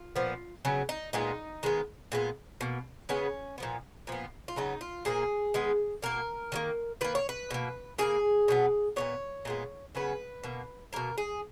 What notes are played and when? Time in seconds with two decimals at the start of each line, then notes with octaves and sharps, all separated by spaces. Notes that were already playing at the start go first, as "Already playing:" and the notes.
Already playing: F4
0.16 A#2 F3 B3
0.65 C#3 F#3 B3
0.89 D#4
1.13 A#2 G#3 B3 D#4
1.63 D#3 G#3 B3
2.12 A#2 G#3 B3
2.61 B2 A#3
3.09 C#3 G#3 B3 C#4
3.58 A#2 F3 B3
4.07 A#2 F3 B3
4.48 F4
4.56 C#3 F#3 B3 D#4
4.81 F4
5.05 A#2 F3 A#3 G#4
5.54 D#3 G#3 B3
6.02 B2 A#3 A#4
6.52 D#3 F#3 A#3
7.01 D#3 A#3 B4
7.15 C#5
7.29 B4
7.51 B2 A#3
7.98 C#3 F3 A#3 G#4
8.48 B2 F#3 B3
8.96 A#2 F#3 B3 C#5
9.45 A#2 G#3 B3
9.95 C#3 F#3 B3 B4
10.43 B2 A#3
10.93 B2 A#3 A#4
11.18 G#4